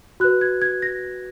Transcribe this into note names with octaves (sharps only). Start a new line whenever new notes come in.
F#4 B4 F#6
G#6
G#6
A#6